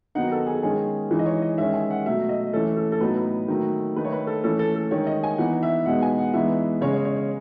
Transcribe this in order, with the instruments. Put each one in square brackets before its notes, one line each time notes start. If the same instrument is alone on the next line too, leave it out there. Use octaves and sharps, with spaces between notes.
[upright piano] D#3 F#3 B3 D#4 F#5
A4
G#4
D#3 G#3 C#4 G#4
E3 G#3 D#4
D#5
C#5
D#5
D#3 G#3 C#4 E5
G#5
F#5
B2 F#3 A3 E5
D#5
E3 A3 C#4 A4
A4
A4
A2 F#3 B3 D#4 B4
D#3 F#3 A3
D#3 A3 D#4 B4
C#5
B4
A4
E3 A3 C#4 A4
A4
A4
D#3 G#3 D#4 C#5
D#5
G#5
E3 B3 D#4 F#5
E5
B2 G#3 B3 D#4 F#5
G#5
F#5
E3 G#3 B3 D#4 E5
C#3 G#3 C#4 C#5
C#5
C#5
C#5